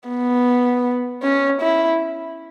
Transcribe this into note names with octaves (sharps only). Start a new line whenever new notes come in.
B3
C#4
E4